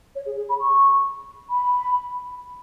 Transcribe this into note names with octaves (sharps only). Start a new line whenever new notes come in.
C#5
G#4
G#4
B5
C#6
B5